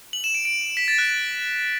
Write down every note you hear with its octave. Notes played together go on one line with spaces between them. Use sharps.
F#7
E7
D7
D7
B6
A6
F#6